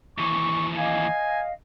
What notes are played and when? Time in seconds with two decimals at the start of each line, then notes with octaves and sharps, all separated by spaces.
0.18 D#2 E3 C#6
0.77 D#5 F5 G#5